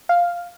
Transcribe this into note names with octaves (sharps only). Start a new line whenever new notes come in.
F5